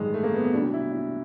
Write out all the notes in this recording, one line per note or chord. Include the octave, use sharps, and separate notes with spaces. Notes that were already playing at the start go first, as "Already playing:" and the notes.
Already playing: A1 G2 D#3 G#3
A3
A#3
B3
B3
C2 B2 F#3 D4
E4
E4